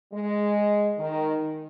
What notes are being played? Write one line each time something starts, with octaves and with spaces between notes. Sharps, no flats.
G#3
D#3